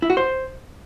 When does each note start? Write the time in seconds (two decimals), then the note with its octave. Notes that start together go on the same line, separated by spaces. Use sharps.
0.02 E4
0.10 F#4
0.17 C5